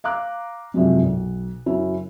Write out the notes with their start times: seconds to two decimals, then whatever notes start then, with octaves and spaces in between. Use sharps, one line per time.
0.04 F5 A#5 D6 F#6
0.74 F#2 C3 F3 F#3 G#3
1.03 B1
1.66 F#1 F#3 C#4 E4